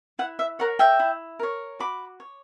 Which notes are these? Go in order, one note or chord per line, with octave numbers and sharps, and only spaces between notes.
E4 F#5
E5
A#4 C#5 F#5
E5 G5
E4
A#4 C#5
F#4 B5 D6
C#5